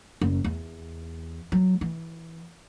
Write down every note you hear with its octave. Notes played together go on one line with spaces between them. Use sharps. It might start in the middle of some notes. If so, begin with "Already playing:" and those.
F#1
E2
F#3
E3